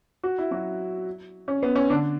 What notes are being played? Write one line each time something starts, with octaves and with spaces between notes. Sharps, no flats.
F#4
E4
F#3 F#4
C#4
B3
C#4
D3 D4